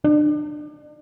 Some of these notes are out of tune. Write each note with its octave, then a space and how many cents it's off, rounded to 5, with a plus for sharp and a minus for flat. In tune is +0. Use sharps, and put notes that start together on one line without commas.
D4 +30